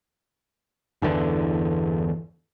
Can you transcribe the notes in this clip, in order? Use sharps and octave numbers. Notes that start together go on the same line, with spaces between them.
G1 E2 D3 E3